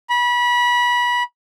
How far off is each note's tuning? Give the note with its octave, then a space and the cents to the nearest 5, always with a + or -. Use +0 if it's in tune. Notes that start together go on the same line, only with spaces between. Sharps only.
B5 -25